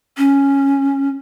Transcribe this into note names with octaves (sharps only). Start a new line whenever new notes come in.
C#4